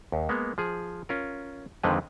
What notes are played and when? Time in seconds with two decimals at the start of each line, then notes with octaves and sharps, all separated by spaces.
0.12 D#2
0.29 G#3 A#3 B3
0.58 F3 G#4
1.09 C#4 F4 A#4
1.83 F2 D3 D#3 G#3 C4 B4